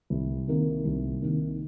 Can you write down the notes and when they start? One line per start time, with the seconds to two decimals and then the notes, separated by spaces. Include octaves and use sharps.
0.10 C2
0.48 C3 D#3 A#3
0.85 C2
1.22 C3 D#3 A#3